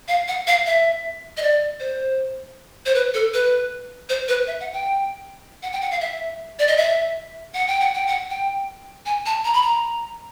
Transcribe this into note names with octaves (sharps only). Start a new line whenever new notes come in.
F5
F#5
F5
E5
D#5
D5
C5
C5
B4
A4
B4
C5
B4
E5
F#5
G5
F#5
G5
F#5
F5
E5
D5
D#5
E5
F#5
G5
F#5
G5
F#5
G5
G#5
A5
A#5
B5
A#5